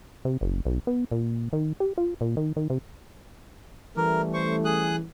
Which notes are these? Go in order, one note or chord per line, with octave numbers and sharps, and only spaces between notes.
C3
F#1
B1
B3
A#2
D#3
G4
F4
A#2
D#3
D#3
C3
E3 G3 A3 C#4 A#4
C5 C#6
G#4 D#6 F#6